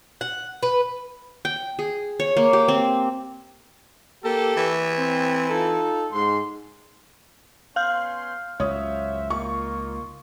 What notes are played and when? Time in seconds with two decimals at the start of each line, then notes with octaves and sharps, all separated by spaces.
0.21 F#5
0.63 B4
1.45 G5
1.79 G#4
2.20 C#5
2.37 A#3
2.53 G4
2.68 C4
4.25 A#3 G4 A4
4.57 E3
4.98 C4
5.49 D#4 F4 A4
6.12 G#2 C6
7.76 B3 C#4 F5 C6 F6 G6
8.60 C#2 F#2 C5 C#5 E5 D#6
9.30 A#3 D#4 F4 C#6